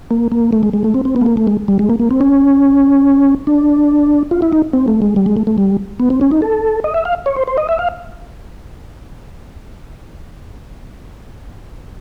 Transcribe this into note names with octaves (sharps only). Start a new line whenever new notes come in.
A#3
A#3
A3
G#3
G#3
A3
C4
C4
B3
A3
A#3
A3
G#3
G3
G#3
A#3
A#3
C4
C#4
D4
F4
E4
D#4
C4
A3
G#3
G3
G#3
A3
A3
G3
B3
C4
C#4
D#4
A4
D#5
E5
F5
C#5
C5
C5
D#5
E5
F5